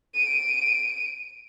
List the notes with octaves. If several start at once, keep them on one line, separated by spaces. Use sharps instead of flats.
D7 D#7